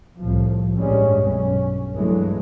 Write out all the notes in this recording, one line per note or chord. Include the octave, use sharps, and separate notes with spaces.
C2 A2 F3
A1 G2 G3 G#3 C#4
B1 G2 C#4
G2 E3 F#3 G#3 A3